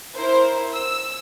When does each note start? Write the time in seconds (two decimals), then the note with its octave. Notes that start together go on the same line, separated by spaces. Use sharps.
0.14 E4 A#4 C5
0.74 E6